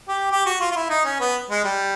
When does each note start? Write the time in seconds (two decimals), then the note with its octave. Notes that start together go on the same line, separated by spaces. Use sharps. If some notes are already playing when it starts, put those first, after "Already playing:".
0.09 G4
0.32 G4
0.46 F#4
0.61 F4
0.72 F4
0.76 E4
0.90 D#4
1.05 C#4
1.20 B3
1.50 G#3
1.64 G3